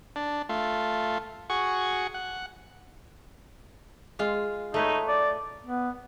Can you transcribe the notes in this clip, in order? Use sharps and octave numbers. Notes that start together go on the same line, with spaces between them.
D4
A3 F4
F#4 G#4 C#6
F#5
G#3 F4 F5
A3 D#4 B4 C#5
D5
B3